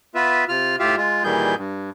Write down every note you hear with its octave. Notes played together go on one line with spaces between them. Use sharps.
B3 F4 B4 E5
C3 F4 F6
A2 F4 G4 E5 F5
G#3 F4
A#2 D#3 E3 G3 G#4 G6
G2